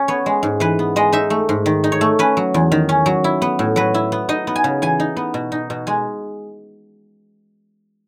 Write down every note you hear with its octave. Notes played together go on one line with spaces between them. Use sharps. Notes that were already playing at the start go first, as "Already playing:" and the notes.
Already playing: C#4
B3 C#5
G#3
G#2
E3 B4
B3
G#3 D#5
D#4 E5
A3
G#2
D#3
D#4
C#5
A3
C#4 B4
F#3
E2
D#3
C#4
F#3
E4
B3
A2
F#3 B4
E4
B3
D#4 D#5
B3
G#5
C#3
E3 G#5
D#4
B3
B2
D#4
B2
G#3 G#5